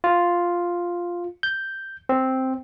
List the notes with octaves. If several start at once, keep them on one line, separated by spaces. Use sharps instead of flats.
F4
G6
C4